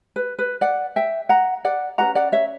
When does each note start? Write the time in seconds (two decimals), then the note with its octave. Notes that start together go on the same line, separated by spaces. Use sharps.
0.16 B4
0.39 B4
0.61 D5 F#5
0.96 E5 G5
1.29 F#5 A#5
1.65 D5 F#5
1.98 C#4 F#4 B4 F#5 A#5
2.15 D5 F#5
2.32 C#5 E5